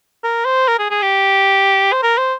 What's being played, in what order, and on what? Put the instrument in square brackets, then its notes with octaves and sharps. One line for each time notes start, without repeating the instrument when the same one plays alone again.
[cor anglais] A#4
C5
A#4
G#4
G#4
G4
C5
A#4
C5